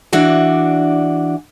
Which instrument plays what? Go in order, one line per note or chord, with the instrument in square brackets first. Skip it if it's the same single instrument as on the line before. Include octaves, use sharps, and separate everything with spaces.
[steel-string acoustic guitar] E3 D4 F#4 D5